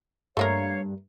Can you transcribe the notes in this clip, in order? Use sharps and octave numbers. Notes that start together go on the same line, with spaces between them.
G2 A3 A#3 A#4 C#5 F5